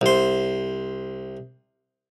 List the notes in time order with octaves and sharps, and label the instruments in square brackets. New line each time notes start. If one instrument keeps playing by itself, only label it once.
[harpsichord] C2 C5